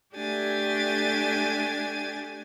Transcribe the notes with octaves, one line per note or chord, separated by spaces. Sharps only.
A3 D4 G4 G#5 A6